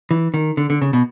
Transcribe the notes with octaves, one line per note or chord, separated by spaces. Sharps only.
E3
D#3
D3
D3
C#3
B2